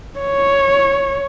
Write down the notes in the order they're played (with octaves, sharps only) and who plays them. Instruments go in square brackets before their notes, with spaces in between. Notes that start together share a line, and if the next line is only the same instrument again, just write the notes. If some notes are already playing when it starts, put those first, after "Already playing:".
[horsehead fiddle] C#5